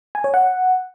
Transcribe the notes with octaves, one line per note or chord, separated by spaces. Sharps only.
G#5
C#5
F#5